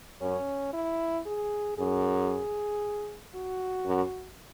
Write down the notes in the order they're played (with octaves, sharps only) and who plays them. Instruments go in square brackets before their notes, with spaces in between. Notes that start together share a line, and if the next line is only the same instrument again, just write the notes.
[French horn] F#2 [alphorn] C#4
[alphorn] E4
G#4
[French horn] F#2 [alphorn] G#4
[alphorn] F#4
[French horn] F#2